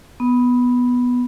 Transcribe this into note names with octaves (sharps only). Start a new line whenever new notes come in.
B3